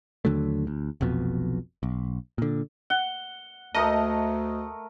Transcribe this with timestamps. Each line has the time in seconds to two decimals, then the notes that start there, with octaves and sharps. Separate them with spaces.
0.25 D#2 D3 F#3 A3
0.67 D2
1.01 F1 B1 F2 B2
1.83 B1
2.38 A#2 D3
2.90 F#5 G7
3.75 D2 A3 A#4 D#5 A5 D#6